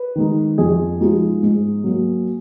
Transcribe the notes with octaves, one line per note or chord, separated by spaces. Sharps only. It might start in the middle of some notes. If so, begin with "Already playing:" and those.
Already playing: B4
D#3 G#3 D#4
F2 G#4
F3 G#3 D#4
G#2
F#3 A#3